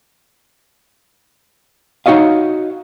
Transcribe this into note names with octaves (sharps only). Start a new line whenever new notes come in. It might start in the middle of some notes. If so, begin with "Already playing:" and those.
D#4 F#4 C#5 D#5 F5